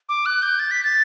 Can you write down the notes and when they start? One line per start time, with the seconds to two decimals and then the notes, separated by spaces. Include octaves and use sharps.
0.09 D6
0.26 F#6
0.42 G6
0.59 A6
0.71 B6
0.84 A6